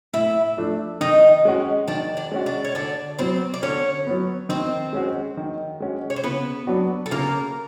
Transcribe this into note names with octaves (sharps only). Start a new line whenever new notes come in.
A2 E4 E5
F3 A3 D4
D#3 D#4 D#5
G#3 C#4 F#4
D#3 D4 D5
D4 D5
G#3 C#4 F#4
D4 D5
C#5
D3 D4 D5
F#3 B3 C4 C5
D5
D3 C#4 C#5
F#3 B3
D#3 C4 C5
G#3 C#4 F#4
D#3
G#3 C#4 F#4
C#5
C5
C#3 B3 B4
F#3 B3 D4 F#4
A4
C#3 A#3 A#4